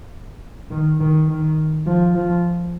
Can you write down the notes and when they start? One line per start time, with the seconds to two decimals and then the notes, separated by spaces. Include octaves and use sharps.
0.71 D#3
1.00 D#3
1.28 D#3
1.86 F3
2.14 F3